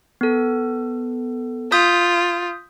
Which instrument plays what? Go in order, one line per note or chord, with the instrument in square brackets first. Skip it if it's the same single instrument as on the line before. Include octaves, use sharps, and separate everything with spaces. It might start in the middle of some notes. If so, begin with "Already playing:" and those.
[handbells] B3 A4
[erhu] F4 [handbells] D#6 G6 B6